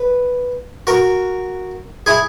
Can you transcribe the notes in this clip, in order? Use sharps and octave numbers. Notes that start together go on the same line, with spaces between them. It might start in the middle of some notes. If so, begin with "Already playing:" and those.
Already playing: B4
F#4 A#4
E4 G#4